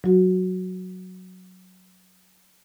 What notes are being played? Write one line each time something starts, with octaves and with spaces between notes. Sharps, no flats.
F#3 F#4